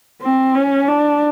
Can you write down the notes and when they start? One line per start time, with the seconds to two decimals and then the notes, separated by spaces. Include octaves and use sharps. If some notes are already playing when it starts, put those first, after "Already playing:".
0.22 C4
0.55 C#4
0.88 D4